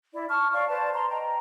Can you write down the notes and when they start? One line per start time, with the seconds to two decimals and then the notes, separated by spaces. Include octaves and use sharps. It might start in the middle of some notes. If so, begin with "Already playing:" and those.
0.13 E4 D5
0.29 A5 C#6 F6
0.52 C#5 D5 F5 C#6
0.68 B4 C5 D5 A5
0.93 A#5 C6
1.09 D#5 G5 A#5